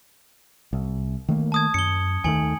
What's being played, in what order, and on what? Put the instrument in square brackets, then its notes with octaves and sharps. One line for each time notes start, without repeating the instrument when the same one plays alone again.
[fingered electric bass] C2
D#3 A3 A#3
[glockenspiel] A5 D#6 G#6
[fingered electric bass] F#2 [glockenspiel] C#7 G7
[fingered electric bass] D#2 D#3 A3 [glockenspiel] G#5 C#7 F#7